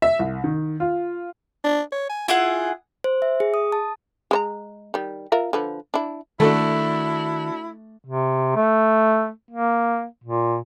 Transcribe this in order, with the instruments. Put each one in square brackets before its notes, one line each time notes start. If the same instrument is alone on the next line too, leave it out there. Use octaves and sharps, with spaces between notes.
[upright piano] E5
C2
D#3
F4
[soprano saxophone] D4
C#5
G#5
[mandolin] E4 G#4 F#5 [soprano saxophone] F4
[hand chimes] C5
E5
G#4
D#6
A5
[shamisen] G#3 C5 A#5
D#3 G3
F4 A#4 E5
D3 F3 B4
D4 E4
[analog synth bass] D#3 [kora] A3 [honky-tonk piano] D4 F#4 A4 [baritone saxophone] E4
[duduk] C3
A3
A#3
A#2